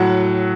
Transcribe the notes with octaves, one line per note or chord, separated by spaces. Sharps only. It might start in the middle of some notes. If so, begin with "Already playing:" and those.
Already playing: A2 F#3 F#5